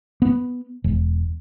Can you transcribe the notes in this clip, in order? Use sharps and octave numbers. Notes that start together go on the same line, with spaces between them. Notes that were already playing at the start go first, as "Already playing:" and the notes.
B3
E1